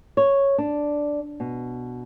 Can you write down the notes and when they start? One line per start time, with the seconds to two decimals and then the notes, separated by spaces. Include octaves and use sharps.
0.17 C#5
0.58 D4
1.40 B2